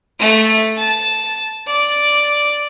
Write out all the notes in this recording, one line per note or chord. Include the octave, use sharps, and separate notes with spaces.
A3
A5
D5